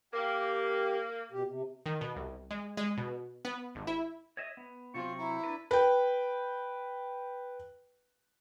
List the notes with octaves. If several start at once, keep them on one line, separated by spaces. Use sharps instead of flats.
A#3 G4
B2 G4
C3
D#3
B2
C2
G#3
G#3
B2
B3
G#1
E4
C#5 D#5 E5
B3
C3 F#3 C4 F4 C#6
E4 A#5
D4 B4
B4 G5